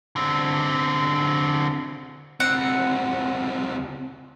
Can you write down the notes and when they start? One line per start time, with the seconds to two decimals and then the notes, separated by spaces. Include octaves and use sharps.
0.16 D3 C4
2.40 C#2 C4 F#5